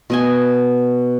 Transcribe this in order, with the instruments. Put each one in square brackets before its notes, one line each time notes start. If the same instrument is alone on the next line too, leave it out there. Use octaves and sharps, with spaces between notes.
[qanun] B2 D#5 G#5